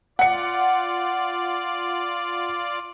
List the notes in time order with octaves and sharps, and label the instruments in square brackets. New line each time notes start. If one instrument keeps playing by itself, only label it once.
[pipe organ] F4 D5 [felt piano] F#5 C#7